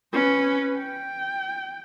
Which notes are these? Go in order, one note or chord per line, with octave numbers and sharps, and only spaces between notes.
C#4 B4
G5